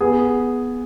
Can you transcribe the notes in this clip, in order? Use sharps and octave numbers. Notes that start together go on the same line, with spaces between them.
B3 G#4